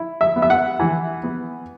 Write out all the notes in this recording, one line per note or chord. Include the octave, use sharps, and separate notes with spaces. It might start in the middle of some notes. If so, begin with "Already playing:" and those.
Already playing: E4
E5
B3
E5
F#5
E3
B3